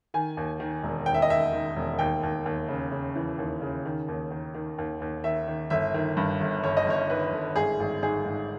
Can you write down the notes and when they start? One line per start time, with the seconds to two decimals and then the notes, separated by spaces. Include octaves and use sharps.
0.14 D#3 G#5
0.37 D#2
0.60 D#3
0.83 E1
1.06 D#2 G5
1.14 E5
1.22 D#5
1.30 D#2 E5
1.53 D#3
1.76 E1
1.99 D#2 G5
2.23 D#2
2.46 D#2
2.69 C#3
2.92 C#3
3.15 E3
3.38 D#2
3.62 C#3
3.85 D#3
4.08 D#2
4.31 D#3
4.54 D#3
4.78 D#2
5.02 D#2
5.24 D#3 E5
5.47 D#3
5.70 G1 E5
5.94 D#3
6.17 G2
6.40 G1
6.63 G1 C#5
6.77 D#5
6.86 G1 C#5
7.10 D#3 B4
7.32 G1
7.56 G#1 G#4
7.80 G#1
8.03 G#2 G#4
8.26 G#2